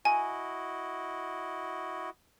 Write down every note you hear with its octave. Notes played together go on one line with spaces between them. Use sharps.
E4 F#4 D#5 G#5